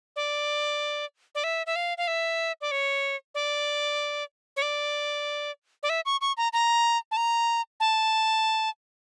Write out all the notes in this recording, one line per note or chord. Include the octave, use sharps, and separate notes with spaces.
D5
D5
E5
E5
F5
F5
E5
D5
C#5
D5
C#5
D5
D5
E5
C#6
C#6
A#5
A#5
A5
A#5
A5